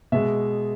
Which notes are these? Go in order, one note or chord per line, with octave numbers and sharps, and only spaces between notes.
B2 G#3 E5